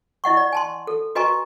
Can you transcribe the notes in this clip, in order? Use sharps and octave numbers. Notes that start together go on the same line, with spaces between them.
E4 D#5 F#5 C#6
D5
G#5 A5 C6
A4
F#4 B4 D#5 G#5 A#5 C#6